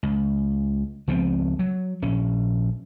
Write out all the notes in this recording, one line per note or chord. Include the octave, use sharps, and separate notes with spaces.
C#2
C#2 F3 B3 C4
F#3
A#1 C#4